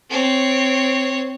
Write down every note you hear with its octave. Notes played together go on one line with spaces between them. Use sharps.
C4 C#5